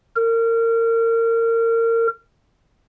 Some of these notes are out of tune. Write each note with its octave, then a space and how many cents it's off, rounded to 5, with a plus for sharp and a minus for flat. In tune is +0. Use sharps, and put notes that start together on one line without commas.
A#4 -30